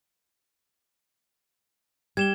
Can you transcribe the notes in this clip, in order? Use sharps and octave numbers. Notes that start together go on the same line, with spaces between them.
G3 G#6 E7 G7